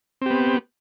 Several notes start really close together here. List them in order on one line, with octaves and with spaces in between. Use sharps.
C4 G4 B3